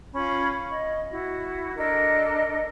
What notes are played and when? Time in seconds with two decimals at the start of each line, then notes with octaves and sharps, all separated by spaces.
0.13 C#4 F4 B5
0.70 D#5
1.10 E4 F#4
1.76 D4 A4 A#4 D#5